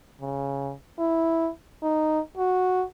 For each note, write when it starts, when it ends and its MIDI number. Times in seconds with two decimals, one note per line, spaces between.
0.21 0.73 49
0.99 1.50 64
1.83 2.20 63
2.37 2.84 66